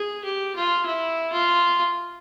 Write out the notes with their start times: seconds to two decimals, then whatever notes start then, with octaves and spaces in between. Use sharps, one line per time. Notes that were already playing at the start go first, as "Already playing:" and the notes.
Already playing: G#4
0.24 G4
0.55 F4
0.86 E4
1.32 F4